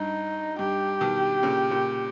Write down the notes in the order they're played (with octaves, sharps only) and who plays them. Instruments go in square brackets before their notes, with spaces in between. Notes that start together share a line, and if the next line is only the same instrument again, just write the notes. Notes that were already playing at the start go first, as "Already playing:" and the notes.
Already playing: [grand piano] G2 [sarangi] D#4
[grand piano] G2 [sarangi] G4
[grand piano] B2 D#3
A#2 C#3
A#2 C#3